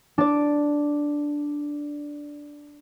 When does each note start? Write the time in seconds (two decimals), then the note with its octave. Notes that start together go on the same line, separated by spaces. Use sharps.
0.18 D4 D5